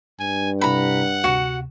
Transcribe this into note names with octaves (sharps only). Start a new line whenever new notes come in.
G2 G#5
C3 E4 A4 F#5 A#5 B5
D2 C3 F#4